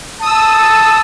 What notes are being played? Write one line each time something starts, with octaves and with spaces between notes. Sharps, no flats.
A5 D#6 E6